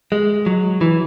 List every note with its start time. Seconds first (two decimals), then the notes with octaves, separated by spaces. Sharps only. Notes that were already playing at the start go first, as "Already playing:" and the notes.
0.12 G#3
0.46 F#3
0.81 E3